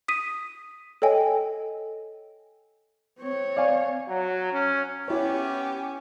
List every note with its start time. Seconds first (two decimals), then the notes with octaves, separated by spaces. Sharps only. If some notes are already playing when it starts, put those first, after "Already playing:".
0.08 D#6 B6 D#7
1.02 A4 C#5 D#5 G5 G#5
3.18 C4 C#5
3.57 D5 F5 G#5
4.08 F#3
4.53 C#4
5.08 B3 C#4 E4 G4 C#5